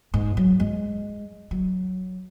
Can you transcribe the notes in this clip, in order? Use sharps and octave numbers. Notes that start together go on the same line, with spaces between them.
G#2
F#3
G#3
F#3